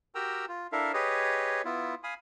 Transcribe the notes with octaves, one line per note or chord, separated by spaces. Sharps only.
F#4 G4 A#4 G5 A#5 E6
F4
D4 E4 A4 A#4 E5 F5
G4 G#4 B4 C#5 D#5
B3 E4 F4
F5 G#5 B5 D#6